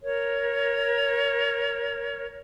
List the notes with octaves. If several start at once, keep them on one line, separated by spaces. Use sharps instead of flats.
A#4 C#5